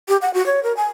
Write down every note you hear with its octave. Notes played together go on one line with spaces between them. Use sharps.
G4
F#5
F#4
C#5
A#4
G#5